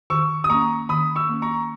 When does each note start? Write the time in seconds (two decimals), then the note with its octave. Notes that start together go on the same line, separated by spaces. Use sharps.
0.10 D#3 C#6 E6
0.44 D#6
0.49 A#3 C#4 A#5 C#6
0.89 D#3 B5 D#6
1.15 C#6 E6
1.29 A#3 C#4
1.42 A#5 C#6